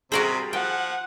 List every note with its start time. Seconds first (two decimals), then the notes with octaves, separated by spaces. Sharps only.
0.12 C3 G3 F#4 G#4 A#4 C5
0.53 F3 F#5 G5